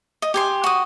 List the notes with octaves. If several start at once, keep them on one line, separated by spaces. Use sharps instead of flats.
D#5
G4 G#5 C6
F#4 D#6